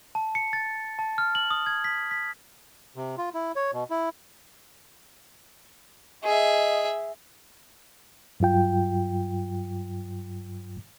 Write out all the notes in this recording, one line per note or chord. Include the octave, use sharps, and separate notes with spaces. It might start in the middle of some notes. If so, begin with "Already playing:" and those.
A5
C#7
A6
A5
F6
F#7
D#6
G#6
B6
B6
C3
F4
E4
C#5
B2
E4
G#4 D#5 E5
G2 F#3 F4 G5